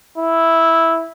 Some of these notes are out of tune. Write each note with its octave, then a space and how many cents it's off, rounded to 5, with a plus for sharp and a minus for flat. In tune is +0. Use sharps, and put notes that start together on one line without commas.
E4 -5